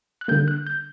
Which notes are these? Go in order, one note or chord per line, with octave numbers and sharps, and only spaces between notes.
F#6
D3 G3 A#3 G6
F#6
G6